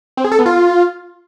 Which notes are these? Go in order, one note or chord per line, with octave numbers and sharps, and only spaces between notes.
C4
G#4
A4
B3
F4